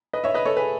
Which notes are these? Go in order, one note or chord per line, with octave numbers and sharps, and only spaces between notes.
B4 D#5
C#5 E5
B4 D#5
A4 C#5
G#4 B4